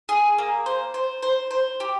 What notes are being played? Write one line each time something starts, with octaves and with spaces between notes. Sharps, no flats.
G#4
A#3
C5
C5
C5
C5
G4